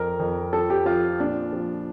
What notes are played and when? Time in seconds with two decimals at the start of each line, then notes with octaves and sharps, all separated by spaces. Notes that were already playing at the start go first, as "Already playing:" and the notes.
Already playing: F2 A#4
0.20 F2
0.53 F3 A4
0.70 G4
0.86 F3 F4
1.19 A#2 D4
1.53 F3